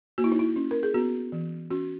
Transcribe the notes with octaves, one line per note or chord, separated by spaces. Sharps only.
A#3 F#4
E4
D#4
E4
C#4
A#4
G#4
B3 F#4
E3
C#4 F#4